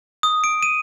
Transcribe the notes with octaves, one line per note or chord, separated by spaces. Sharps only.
D#6
D7
D#7